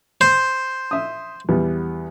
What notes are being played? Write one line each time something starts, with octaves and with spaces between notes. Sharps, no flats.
C5
E5 D#6
E2 G3 B3